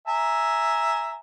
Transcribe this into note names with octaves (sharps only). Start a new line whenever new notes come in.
E5 G#5 A#5